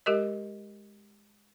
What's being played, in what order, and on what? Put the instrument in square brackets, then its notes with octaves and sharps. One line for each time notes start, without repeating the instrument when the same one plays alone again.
[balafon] G#3 G4 A#4 D#5